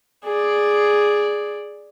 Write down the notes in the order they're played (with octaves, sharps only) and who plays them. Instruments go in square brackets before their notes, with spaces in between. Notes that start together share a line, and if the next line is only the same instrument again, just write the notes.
[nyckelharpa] G#4 D5